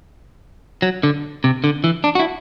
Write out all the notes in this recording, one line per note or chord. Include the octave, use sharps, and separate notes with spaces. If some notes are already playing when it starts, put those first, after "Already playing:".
F#3
D3
C3
D3
E3
D4
F#4
E4